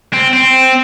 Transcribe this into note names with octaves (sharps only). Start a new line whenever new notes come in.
C4
C4